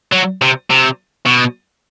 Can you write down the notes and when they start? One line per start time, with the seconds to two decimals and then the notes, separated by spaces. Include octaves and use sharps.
0.12 F#3
0.42 C3
0.70 C3
1.26 B2